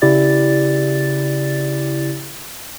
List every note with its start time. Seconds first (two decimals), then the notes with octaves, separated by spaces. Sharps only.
0.02 C#3 E4 G4 D5 A6